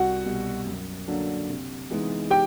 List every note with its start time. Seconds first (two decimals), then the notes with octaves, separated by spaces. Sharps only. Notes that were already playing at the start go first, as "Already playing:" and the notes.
Already playing: C2 F#4 F#5
0.25 B2 G3
0.66 F#2
1.08 D3 F#3 A#3 D4
1.49 C3
1.90 E3 G#3 B3 D#4
2.30 G4 G5